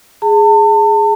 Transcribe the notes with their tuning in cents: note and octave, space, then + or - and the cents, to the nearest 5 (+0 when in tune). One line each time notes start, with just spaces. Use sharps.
G#4 +0 A5 +35